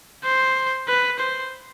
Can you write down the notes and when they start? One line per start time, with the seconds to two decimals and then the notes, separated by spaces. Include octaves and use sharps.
0.24 C5
0.88 B4
1.19 C5